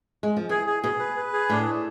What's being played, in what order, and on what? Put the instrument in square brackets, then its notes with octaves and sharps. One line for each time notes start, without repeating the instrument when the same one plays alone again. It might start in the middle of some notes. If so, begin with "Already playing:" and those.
[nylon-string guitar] G#3
F3
[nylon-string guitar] E3 [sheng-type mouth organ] G#4
[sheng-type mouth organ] G#4
[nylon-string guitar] B2 [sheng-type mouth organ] G#4
[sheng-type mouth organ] B4
B4
G#4
[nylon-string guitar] A2 [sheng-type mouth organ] D4
[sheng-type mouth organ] A3